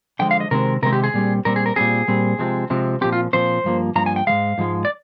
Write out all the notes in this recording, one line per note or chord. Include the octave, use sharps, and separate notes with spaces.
D3 F3 G#3 G5
F5
D#5
C3 D#3 G#3 C4 A#4
C3 D#3 G#3 C4 A#4
G4
G#4
A#2 G3 C4
A#2 G3 C4 A#4
G#4
A#4
A#2 G3 C4 G#4
A#2 G3 C4
C3 F3 G#3 C4
C3 F3 G#3 C4
A#2 F3 C4 G4
F4
A#2 F3 C4 C5
G2 F3 A#3
G2 F3 A#3 A#5
G#5
G5
G#2 F3 G#3 F5
G#2 F3 G#3
D5